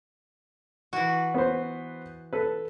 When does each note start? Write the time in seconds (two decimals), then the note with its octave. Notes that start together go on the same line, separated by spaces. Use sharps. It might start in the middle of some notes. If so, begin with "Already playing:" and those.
0.93 E3 F#4
1.34 B3 C5
2.33 A4 B4